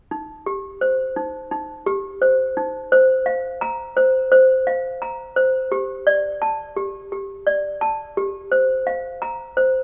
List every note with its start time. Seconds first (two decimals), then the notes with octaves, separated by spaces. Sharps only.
0.11 D#4
0.46 G4
0.81 C5
1.16 D#4
1.51 D#4
1.86 G4
2.22 C5
2.57 D#4
2.92 C5
3.26 F5
3.61 A#5
3.97 C5
4.32 C5
4.67 F5
5.02 A#5
5.36 C5
5.72 G4
6.07 D5
6.42 A5
6.76 G4
7.12 G4
7.47 D5
7.81 A5
8.17 G4
8.52 C5
8.87 F5
9.22 A#5
9.57 C5